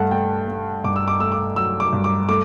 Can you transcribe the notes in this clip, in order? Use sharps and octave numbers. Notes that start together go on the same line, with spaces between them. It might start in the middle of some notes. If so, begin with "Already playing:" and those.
Already playing: G2 A3 F#5 A5
A3 G5
A3
G2 D6
E6
D6
A3 E6
D6
F#3 E6
D6
G2
D6
A3 D6